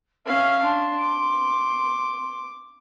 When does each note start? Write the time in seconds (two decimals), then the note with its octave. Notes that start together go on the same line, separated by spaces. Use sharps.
0.26 C#4 E5 F5
0.63 D4 C6
0.99 D6